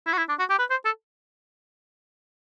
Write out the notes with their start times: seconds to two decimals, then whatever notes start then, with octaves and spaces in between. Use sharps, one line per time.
0.07 E4
0.13 F#4
0.18 E4
0.29 D4
0.39 F#4
0.50 G4
0.59 B4
0.70 C5
0.85 A4